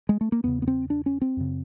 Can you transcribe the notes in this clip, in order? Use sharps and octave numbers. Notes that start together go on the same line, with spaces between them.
G#3
A3
A#3
E2 C#3 B3
B3
C4
D4
C#4
C4
F#2 C#3